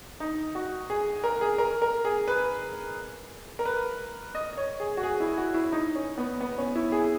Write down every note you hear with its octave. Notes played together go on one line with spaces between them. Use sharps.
D#4
F#4
G#4
A#4
G#4
A#4
A#4
G#4
B4
A#4
B4
D#5
D#5
C#5
G#4
F#4
G#4
E4
F#4
E4
D#4
C#4
B3
B3
C#4
E4
G#4